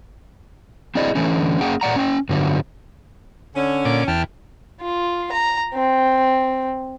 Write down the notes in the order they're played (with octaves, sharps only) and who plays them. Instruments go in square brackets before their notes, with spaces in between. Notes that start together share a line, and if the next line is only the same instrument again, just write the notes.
[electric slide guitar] C4 E4 G#4 D5 D#5
D3 E3 A3 C#4
A#3 C#4 G#4 F#5 G5
A#2 D5 F#5 A#5
C#4 G5
G2 D3 F#3
[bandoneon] D3 [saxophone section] C#4
[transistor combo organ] A#2 D5
[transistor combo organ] E2 [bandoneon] G5 A5 F6
[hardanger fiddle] F4
A#5
C4